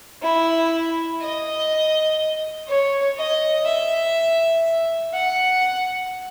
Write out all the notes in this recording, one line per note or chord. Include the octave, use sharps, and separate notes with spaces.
E4
D#5
C#5
D#5
E5
F#5